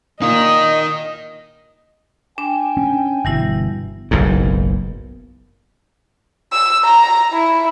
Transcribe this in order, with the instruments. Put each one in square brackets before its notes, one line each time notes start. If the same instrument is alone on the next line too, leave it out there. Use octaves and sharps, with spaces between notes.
[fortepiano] A#2 [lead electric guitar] D#4 A#4 [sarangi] D#5 [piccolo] D#6
[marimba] D4 [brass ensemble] G5 G#5
[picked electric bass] C#4
[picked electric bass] G1 B2 [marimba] E3 G3 E4
[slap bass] F#1 B1 G#2
[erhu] E6
A#5
E4